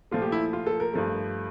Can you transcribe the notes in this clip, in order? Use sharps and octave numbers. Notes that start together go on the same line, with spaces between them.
A#2 F3 A3 F4
G4
E4
F4
A4
A#4
G2 F3 A3